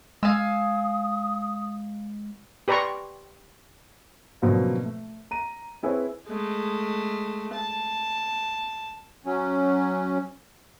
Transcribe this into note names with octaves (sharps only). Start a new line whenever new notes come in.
G#3 F5 G#5 D#6 E6
G4 B4 D5 A#5 C6 C#6
B2 D3 F3 F#3 A#3 C4
A3
A#5 D#7
C4 E4 G#4 B4 C#5
G#3 A3
A5
F#3 C#4